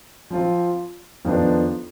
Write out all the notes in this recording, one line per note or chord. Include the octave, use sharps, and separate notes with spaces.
F3 C4 F4
F2 D#3 B3 D4 F4